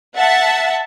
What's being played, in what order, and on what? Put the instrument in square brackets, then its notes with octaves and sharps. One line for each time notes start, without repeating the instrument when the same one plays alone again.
[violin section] E5 F#5 A5